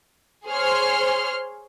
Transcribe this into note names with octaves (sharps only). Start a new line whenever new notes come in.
G#4 C5 C#5 C6 F6